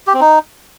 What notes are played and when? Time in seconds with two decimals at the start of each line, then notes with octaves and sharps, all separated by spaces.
0.07 G4
0.14 C4
0.21 D#4